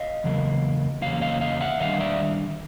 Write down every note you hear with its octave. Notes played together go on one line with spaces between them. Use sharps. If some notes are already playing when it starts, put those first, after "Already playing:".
Already playing: D#5 F5
E2 C#3 F#3 A#3
E2 C#3 F#3 A#3 F5
D#5 F5
D#5 F5
E5 F#5
D#3 G3 D4 D#5 F5
D5 E5